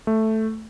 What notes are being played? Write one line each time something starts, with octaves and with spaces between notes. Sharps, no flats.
A3